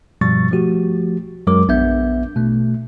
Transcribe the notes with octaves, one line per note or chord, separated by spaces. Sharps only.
G2 B2 F3 G3 C#6 A6
F3 A3 F#4 G4
F#2 F#3 G#3 A#4 D6
A#1 B3 D4 E5 G6
B2 A3